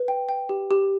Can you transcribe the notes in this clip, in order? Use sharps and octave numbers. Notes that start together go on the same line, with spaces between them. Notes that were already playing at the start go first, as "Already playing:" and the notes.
Already playing: B4
G5
G5
G4
G4